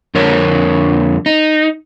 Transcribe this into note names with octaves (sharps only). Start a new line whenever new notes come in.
F2 D3 A#4 C#5
D#4